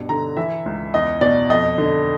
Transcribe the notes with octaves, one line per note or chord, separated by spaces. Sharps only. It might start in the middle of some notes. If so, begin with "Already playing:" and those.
Already playing: G2 B2
D3 A#5
E3 E5
C#2
E2 D#5
B2 D5
F2 D#5
D3